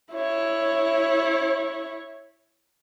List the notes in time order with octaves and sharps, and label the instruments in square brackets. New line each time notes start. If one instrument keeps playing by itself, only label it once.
[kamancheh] E4 C#5